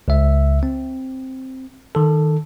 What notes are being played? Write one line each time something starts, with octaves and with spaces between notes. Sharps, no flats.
C#2 E5
C4
D#3 A4